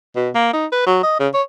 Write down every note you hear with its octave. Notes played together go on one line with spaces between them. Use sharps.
B2
A#3
D#4
B4
F#3
D#5
C#3
C#5